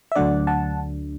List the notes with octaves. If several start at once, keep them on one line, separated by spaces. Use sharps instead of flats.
E5
D2 D3 F#3 A3 D4 D5 F#5
F#5 A5